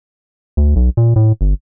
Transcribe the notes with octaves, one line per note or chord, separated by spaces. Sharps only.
D2
B1
A#2
A2
G1